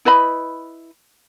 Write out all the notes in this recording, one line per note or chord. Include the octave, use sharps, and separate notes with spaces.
E4 B4 D#5 B5